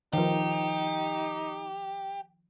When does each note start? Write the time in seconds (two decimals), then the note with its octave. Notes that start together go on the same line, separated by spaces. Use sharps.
0.13 D#3 F3 D#4 G4